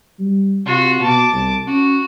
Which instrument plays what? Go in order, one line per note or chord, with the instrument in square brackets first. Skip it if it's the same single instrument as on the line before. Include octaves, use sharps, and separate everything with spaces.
[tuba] G3
[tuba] C3 [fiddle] F4 F#4
[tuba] B2 [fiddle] A5 D6
[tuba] C2
[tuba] C#4 [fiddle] F#4